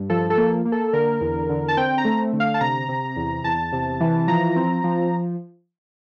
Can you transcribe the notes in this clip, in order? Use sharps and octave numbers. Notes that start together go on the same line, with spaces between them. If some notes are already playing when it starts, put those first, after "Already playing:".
Already playing: G2
F3 A4
A4
A#3
A#3
A4
D3 A#4
E2
D3
A5
C4 G5
A#5
A3
D3
F5
A5
C3 A#5
C3
E2
E2 A5
C3
E3
F3 A#5
C4
F3